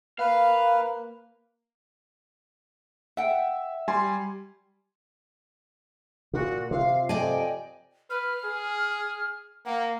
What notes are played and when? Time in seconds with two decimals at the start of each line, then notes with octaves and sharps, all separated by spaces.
0.19 A#3 B4 F5
3.17 E5 F#5 G5
3.88 G3 G#5 C6
6.33 A#2 F#4
6.71 C3 F4 F5
7.09 F2 D5 D#5 G5 G#5
8.10 B4 F6
8.44 G#4
9.65 A#3 F#5